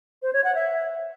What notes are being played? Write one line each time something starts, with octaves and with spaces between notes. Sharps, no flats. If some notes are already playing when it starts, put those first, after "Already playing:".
C5
C#5
F#5
E5